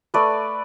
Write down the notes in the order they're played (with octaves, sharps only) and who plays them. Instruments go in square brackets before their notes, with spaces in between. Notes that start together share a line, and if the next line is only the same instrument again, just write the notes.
[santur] A3 B4 D5